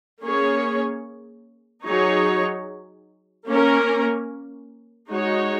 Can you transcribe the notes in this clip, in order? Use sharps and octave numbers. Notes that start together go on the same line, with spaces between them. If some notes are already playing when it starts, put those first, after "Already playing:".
A#3 C#4 G#4 C#5
F#3 D#4 G#4 C#5
A#3 C#4 A#4
G#3 D#4 F#4 C#5